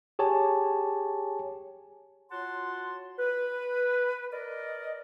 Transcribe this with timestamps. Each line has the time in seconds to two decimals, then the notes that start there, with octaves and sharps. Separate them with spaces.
0.19 G4 G#4 C#5 G#5 A5
2.31 F4 F#4 C#5 F#5 A5 C6
3.19 B4
4.32 A#4 D5 D#5